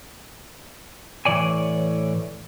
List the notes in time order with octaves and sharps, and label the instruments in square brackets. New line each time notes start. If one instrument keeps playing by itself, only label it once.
[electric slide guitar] A2 E3 C#5 D5 G#5